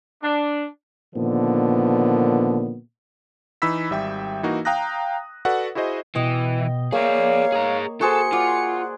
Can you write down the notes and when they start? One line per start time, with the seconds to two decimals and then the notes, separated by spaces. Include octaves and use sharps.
0.23 D4
1.15 A#2 D3 D#3 F3 B3
3.62 E3 D#4 B5 E6 B6
3.90 G#1 G3 E5 G5 E6
4.43 E3 A#3 D#4 F#4
4.65 F5 G5 A#5 D#6 F#6 A#6
5.45 F#4 A4 B4 D5 F#5
5.75 E4 F#4 G#4 C5 D#5
6.15 B2 E3 D#5 G5
6.93 A#3 G#4 C#5 D5 F5
7.52 G#4 A#5
8.01 F#4 G#4 A4 C5 C#7
8.33 F4 D5 F#5